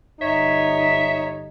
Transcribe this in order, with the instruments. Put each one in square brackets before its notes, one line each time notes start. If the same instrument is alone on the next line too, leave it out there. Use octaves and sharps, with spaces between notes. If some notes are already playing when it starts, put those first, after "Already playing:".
[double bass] G1 D#4 [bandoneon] C#5 [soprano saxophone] E5